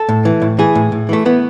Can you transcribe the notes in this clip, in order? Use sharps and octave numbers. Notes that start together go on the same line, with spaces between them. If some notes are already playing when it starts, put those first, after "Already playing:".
Already playing: A4
A2
E3
A2
E3 G#4
A2
A2
E3 A3
E3 B3